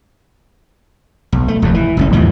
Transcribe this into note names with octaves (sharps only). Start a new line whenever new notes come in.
B1
A3
F1 D#2 G#2
E3
F#1 C2 C#4
D#2 G#2 E3 F3